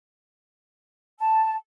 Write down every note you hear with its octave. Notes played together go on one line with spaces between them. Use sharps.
A5